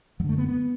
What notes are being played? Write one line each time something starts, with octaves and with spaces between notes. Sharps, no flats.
F#2 D3 F#3 A3
B3
B3